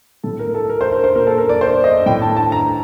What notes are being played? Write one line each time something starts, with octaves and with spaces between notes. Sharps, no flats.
A2 A4
A#4
A4
A#4
C5
A#4
C5
A#2 A#4
A4
A#4
D5
C5
D#5
A2 G5
A5
A5
A#5